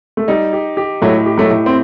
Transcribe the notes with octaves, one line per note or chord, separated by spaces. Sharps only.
A3
G3 D#4
G4
G4
A2 F#3 A3
G4
F#3 A3
A2
C4